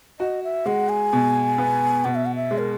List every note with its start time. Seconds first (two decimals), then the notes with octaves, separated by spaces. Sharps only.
0.20 F#4 D#5
0.43 E5
0.66 G#3 F#5
0.89 G#5
1.13 B2
1.58 B3
2.05 B2 F#5
2.15 E5
2.26 F#5
2.36 E5
2.51 G#3
2.58 A#4